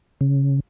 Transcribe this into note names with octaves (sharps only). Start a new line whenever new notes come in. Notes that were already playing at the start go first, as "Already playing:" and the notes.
C#3